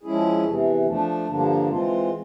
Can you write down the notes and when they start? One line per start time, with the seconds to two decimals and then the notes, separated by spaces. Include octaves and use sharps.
0.03 F3 G#3 C#4 E4 G#4
0.44 E2 C3 E3
0.86 F3 A3 D4
1.27 G2 D3 F3 A#3 D4
1.69 E3 G#3 C4 F4